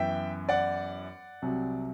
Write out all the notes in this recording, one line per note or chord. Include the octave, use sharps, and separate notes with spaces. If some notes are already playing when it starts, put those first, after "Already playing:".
Already playing: F#2 E3 B3 E5 G5
D5 F#5
C2 C3 F#3